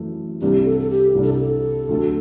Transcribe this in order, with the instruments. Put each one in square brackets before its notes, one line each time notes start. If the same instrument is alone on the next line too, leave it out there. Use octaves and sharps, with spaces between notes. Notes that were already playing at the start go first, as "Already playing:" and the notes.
Already playing: [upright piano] F#2 E3 A3
[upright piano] C2 C3 G3 D4 [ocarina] G4
[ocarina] A4
A4
G4
[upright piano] C2 C3 G3 D4
[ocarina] A4
G4
A4
[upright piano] D2 D3 F#3